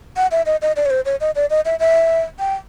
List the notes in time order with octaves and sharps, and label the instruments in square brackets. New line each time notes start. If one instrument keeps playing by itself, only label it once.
[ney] F#5
E5
D#5
D#5
D5
C#5
C5
C#5
D#5
D5
D#5
E5
E5
G5